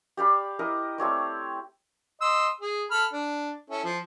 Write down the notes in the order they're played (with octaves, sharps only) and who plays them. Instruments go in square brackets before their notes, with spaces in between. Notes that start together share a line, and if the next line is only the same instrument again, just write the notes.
[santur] G4 D5 F5 B5
E4 A#4 D#5
A3 C4 C#5 D5
[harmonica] D#5 C6 E6
G#4
A4 B5 F6
D4
C#4 E4 A4
F3